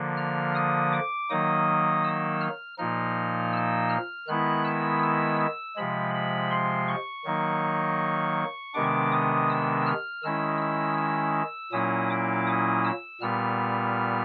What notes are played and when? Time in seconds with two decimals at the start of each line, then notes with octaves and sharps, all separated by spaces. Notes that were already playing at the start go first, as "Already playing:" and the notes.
Already playing: D3 F3 A#3
0.17 F6
0.55 D#6
0.92 D6
1.29 D#3 F#3 A#3 D#4 D#6
2.04 E6
2.41 F6
2.78 A#2 F3 A#3 D#4 F6
3.53 E6
3.90 F6
4.28 D#3 G#3 B3 E4 F#6
4.64 E6
5.02 E6
5.40 E6
5.76 C3 F3 G#3 B5
6.14 B5
6.51 C6
6.88 C#6
7.25 D#3 F#3 A#3 D#4
8.74 C3 D#3 G#3 B3 D4 D6
9.12 D#6
9.49 E6
9.86 F6
10.23 D#3 G#3 C#4 E4 E6
10.61 E6
10.97 E6
11.72 A#2 F#3 A#3 C#4 E4 D#6
12.10 D6
12.47 D#6
12.84 E6
13.21 A#2 G3 B3 F6